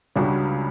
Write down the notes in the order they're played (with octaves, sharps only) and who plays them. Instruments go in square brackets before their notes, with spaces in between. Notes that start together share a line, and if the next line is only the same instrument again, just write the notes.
[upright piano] C#2 C#3 G3 D4 F#4